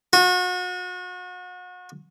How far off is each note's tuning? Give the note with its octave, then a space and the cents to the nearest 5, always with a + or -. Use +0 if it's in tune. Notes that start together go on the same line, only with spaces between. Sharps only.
F#4 -35